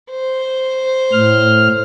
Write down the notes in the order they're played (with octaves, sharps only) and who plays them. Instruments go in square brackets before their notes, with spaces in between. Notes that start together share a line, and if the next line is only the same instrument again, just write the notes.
[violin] C5
[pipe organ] A2 F6